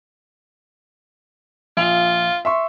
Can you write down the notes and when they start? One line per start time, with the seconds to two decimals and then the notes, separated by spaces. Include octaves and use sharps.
1.77 A#1 F4 F5 F7
2.45 E5 C6 C#6